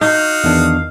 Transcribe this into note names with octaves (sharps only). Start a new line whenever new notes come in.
D#4 F#4 F5 D#6 F6
E2 D#3 D4